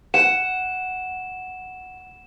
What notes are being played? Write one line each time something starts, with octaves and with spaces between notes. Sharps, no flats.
F#5 E7